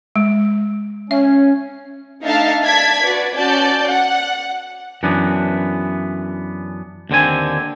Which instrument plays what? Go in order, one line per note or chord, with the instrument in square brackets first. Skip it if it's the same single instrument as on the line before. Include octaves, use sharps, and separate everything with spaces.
[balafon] G#3
[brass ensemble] C#4 [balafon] E5
[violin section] A3 D4 D#4 E5 F5 A5
D5 A5 G#6 B6
F#4 B4 D5
C#4 F#4 D5 A5 G6
F#5
[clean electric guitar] F#2 E3 B3 D4
D#2 D3 C4 G#5